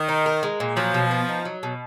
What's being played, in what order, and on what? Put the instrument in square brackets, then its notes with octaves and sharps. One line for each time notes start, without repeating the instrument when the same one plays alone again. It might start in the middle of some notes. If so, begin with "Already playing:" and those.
Already playing: [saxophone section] D#3
[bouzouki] D#4
A#4
G#3
A#2
[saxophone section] F3 [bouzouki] F#3
[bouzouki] B2
B3
D#4
F#3
B2